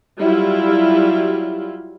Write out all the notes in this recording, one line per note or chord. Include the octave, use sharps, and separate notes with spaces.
F#3 G3 E4 F4